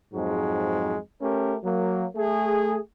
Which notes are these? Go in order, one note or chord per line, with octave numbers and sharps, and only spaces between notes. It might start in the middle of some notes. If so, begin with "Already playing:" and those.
F2 G#2 F#3 G#3
A3 C#4 G4 A#4
F#3 A#3
A3 G#4